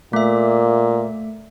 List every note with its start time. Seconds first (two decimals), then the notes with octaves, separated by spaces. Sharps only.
0.13 A#2 A3 E5